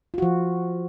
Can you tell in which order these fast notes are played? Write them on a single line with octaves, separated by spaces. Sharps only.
F4 F#4 F3